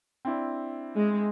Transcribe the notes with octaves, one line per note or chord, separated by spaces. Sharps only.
C4 D4 E4
G#3